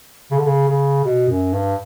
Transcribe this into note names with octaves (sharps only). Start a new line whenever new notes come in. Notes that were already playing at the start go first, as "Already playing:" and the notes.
C#3
D3
C#3
C#3
B2
F#2
G2